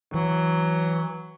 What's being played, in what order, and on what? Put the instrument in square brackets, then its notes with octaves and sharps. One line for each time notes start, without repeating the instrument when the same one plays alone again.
[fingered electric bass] E3 [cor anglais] F#3